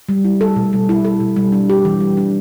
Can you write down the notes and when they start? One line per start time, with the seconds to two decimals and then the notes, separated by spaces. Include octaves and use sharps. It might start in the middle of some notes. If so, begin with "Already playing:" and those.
0.09 G3
0.24 E4
0.41 A4
0.56 B2
0.73 G3
0.89 E4
1.05 A4
1.20 B2
1.36 G3
1.52 D4
1.70 G4
1.85 E3
2.00 G3
2.17 D4